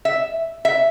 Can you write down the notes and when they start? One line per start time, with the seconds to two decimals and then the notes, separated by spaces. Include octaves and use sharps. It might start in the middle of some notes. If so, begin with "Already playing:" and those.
0.05 E5
0.65 E5